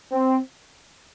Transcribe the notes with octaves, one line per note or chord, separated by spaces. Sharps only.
C4